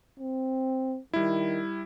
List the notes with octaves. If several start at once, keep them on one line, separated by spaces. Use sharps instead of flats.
C4
D#3 G3 E4